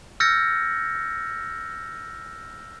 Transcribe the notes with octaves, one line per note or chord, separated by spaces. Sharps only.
E6 F6 G6 A6 A#6 C#7